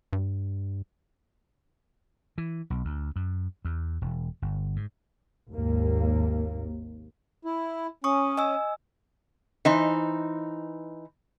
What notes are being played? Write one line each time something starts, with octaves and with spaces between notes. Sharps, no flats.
G2
E3
B1
D2
F#2
E2
E1
G1
G#2
G#1 D#2 A#3
E4
C#4 C#6 D#6
D#5 G#5 E6
E3 D#4 C5